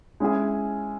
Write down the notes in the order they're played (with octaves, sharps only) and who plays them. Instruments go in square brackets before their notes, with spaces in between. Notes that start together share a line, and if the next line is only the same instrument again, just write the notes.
[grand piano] G#3 C#4 E4 G#4